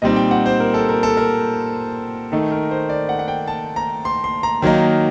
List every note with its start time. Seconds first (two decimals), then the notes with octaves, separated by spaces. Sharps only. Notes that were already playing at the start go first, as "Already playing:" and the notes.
0.02 A#2 G3 C4 D#4 D#5
0.16 G5
0.31 F#5
0.46 C5
0.60 A#4
0.74 A4
0.89 A#4
1.03 A4
1.17 A#4
2.32 D#3 A3 D#4 A4
2.52 A#4
2.71 C5
2.90 D5
3.09 F#5
3.19 F#5
3.28 G5
3.47 A5
3.76 A#5
4.05 C6
4.24 C6
4.43 A#5
4.62 D#3 F#3 A#3 D#4